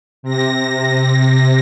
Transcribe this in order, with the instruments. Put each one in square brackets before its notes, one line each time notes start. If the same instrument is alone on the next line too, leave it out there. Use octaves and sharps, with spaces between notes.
[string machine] C3 A#6